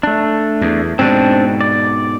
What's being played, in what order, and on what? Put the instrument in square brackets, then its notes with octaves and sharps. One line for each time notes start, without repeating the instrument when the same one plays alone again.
[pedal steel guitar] A3 D4
[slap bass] E2
[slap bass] G#2 B2 [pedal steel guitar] C4 D4
[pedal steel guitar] D5